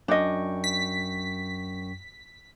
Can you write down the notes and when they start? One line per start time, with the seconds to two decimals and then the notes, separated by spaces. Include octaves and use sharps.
0.08 F#2 D4 D#5 G5 C#6
0.64 B6